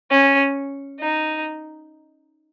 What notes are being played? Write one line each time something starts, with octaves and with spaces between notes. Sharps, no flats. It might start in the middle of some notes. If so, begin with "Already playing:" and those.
C#4
D#4